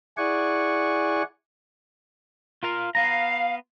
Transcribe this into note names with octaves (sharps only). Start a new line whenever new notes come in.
E4 G#4 D5 F#5 G#5 C#6
F4 A#4 F5
B3 F5 A#5